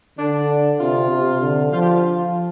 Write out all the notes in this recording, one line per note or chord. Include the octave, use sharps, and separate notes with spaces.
D3 D4
C3 F4
C3
D3
F3 F4
G4
F4